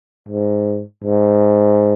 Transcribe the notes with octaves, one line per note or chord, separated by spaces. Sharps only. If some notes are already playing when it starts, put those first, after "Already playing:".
G#2
G#2